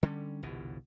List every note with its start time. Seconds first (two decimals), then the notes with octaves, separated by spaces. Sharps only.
0.03 D3 G3 C#4
0.43 G1 C2 B2 E3